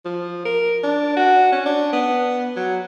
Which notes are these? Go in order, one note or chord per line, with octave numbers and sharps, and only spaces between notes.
F3
A#4
D4
F#4
C#4
D4
B3
F#3